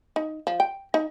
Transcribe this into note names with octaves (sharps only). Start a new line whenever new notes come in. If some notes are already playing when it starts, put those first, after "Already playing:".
D#4
F3
G5
D#4